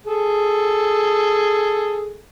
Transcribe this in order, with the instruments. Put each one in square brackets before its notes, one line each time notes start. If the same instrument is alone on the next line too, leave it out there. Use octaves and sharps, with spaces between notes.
[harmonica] G#4 A4